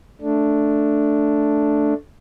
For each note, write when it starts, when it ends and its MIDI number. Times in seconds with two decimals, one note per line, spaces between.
0.22 1.94 57
0.22 1.94 62